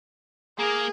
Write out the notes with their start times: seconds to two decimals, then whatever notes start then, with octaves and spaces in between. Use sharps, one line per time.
0.59 A#3 G#4 A#4